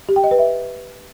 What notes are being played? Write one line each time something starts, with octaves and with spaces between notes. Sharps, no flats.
G4
G5
D#5
B4
E5